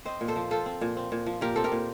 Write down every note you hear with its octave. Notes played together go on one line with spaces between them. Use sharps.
C4 C5 D#5
A#2
A4 C5
F3
F4 A4 C5
C4
A#2
C4
A#2
F3
A#2 G4 A#4
C4 A4
G4 A#4
A#2